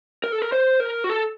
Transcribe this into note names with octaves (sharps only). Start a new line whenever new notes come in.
A#4
A4
A#4
C5
A#4
F#4
A4